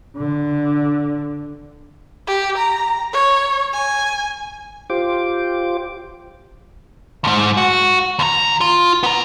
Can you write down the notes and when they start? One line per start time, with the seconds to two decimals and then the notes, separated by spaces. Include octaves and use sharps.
0.16 D3
2.27 G4
2.58 A#5
3.13 C#5
3.73 G#5
4.90 F4 G4 C5 D6
7.24 D2 G#2
7.57 F#4
8.19 D#2 A#5
8.61 F4
9.03 B3 A#5